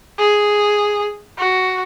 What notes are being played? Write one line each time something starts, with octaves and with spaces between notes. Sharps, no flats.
G#4
F#4